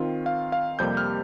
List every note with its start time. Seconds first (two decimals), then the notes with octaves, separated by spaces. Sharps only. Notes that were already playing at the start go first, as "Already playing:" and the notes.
Already playing: D#3 C4 F4
0.26 F5
0.52 F5
0.79 F2 C3 G3 A#3 G6
0.97 F6